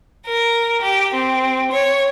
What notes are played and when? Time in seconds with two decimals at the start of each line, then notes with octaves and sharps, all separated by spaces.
0.25 A#4
0.80 G4
1.15 C4
1.72 C#5